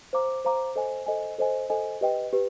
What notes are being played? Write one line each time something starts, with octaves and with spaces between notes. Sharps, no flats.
C5 F5 A#5 D6
C5 F5 A#5 D6
A4 C5 D#5 G#5
A4 C5 D#5 G#5
A4 C5 D#5 G#5
A4 C5 D#5 G#5
G4 B4 D#5 G5
G4 B4